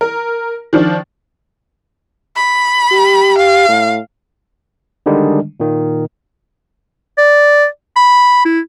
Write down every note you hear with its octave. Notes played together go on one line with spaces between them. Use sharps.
A#4
D#3 F3 D4
B5
G4
F5
A2
D3 D#3 G3 G#3 D4
A#2 D#3 A#3
D5
B5
E4